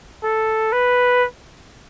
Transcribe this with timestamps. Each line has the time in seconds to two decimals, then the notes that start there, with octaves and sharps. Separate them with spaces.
0.24 A4
0.73 B4